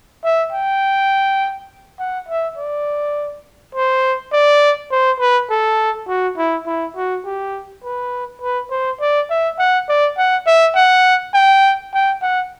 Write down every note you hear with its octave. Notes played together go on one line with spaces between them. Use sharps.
E5
G5
F#5
E5
D5
C5
D5
C5
B4
A4
F#4
E4
E4
F#4
G4
B4
B4
C5
D5
E5
F#5
D5
F#5
E5
F#5
G5
G5
F#5